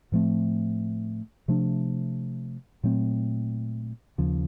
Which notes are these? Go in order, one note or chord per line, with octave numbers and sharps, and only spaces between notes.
A2 F3 A3 C4
C3 F3 A3 D4
A#2 F#3 A3 C4
D#2 C#3 F3